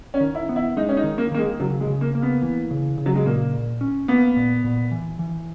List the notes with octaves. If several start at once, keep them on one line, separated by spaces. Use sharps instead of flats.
C#4
D#3
E4
B3
E4
G#3 D#4
C#4
D#4
D#3
A#3
D#3 A#3
G#3
C#3 F#3
G#3
C#3
A#3
A#3
B3
E3
C#3
C#3
F#3
G#3
A#2 A#3
A#2
C#4
A#3 B3
A#2
A#2
E3
E3